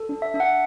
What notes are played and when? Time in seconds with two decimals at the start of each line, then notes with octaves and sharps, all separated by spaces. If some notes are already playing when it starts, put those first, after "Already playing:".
Already playing: A4
0.09 D4
0.22 E5
0.34 D4 E5
0.40 F#5